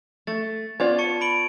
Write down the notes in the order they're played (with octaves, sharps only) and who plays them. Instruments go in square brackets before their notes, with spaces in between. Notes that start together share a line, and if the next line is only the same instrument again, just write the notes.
[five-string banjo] A3 [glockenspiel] A6
[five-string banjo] B3 F4 D5 [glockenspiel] G#6
[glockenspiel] A5 C#6 C#7
B5 D7 F#7